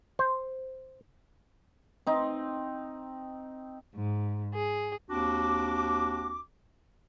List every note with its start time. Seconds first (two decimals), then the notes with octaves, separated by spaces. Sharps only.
0.19 C5
2.07 C4 D#4
3.94 G#2
4.53 G#4
5.10 D#2 C4 D4 F#4 D6